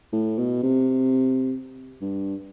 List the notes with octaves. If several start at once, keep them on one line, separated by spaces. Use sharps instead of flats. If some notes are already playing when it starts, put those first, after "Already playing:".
A2
B2
C3
G2